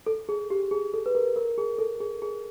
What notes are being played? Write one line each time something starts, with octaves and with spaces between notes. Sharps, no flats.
A4
G#4
G4
G#4
A4
B4
A#4
A#4
G#4
A4
G#4
G#4